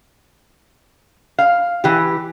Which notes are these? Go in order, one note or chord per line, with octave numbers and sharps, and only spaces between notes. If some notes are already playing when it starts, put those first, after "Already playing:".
F5
E3 G4